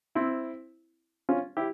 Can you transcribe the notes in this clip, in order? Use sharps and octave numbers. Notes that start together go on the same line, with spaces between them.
C4 E4
C#4 F4
E4 G4